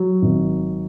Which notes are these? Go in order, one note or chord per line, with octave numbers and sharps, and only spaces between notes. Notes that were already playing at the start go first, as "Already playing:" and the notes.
Already playing: F#3
G#1